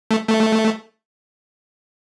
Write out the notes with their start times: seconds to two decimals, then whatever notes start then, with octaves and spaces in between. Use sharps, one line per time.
0.11 A3
0.28 A3